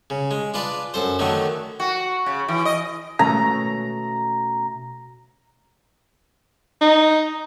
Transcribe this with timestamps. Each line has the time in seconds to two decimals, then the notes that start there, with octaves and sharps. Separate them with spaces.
0.10 C#3
0.31 G#3
0.54 D4 F4 B4 D5
0.94 F#2 A4 C5
1.19 D3 D#3 F#3 A3
1.80 F#4
2.26 C#3
2.48 E3
2.65 D#5
3.19 B2 A3 C#4 A#5
6.81 D#4